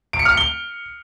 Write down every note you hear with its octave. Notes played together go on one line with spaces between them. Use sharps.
D7
C#7
F6
C#7
G7